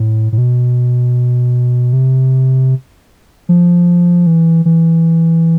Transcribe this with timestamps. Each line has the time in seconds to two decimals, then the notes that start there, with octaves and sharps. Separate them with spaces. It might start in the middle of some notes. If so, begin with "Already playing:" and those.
Already playing: A2
0.32 A2
0.38 B2
1.93 C3
3.49 F3
4.27 E3
4.65 E3